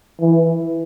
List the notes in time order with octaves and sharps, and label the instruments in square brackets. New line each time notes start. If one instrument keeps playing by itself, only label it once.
[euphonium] E3